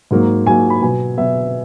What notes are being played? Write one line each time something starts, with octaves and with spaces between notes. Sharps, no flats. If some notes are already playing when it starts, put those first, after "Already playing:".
G#2 F#3 A#3
G#2 F#3 A#3 G#5
B5
B2 F#3 B3 G#5
B2 F#3 B3 E5